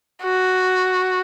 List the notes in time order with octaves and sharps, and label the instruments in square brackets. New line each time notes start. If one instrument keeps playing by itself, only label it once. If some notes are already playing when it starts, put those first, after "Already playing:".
[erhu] F#4